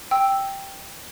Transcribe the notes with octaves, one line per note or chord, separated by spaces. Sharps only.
G5 E6